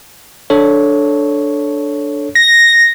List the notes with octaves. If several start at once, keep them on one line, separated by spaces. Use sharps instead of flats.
D4 A4 C#5
A#6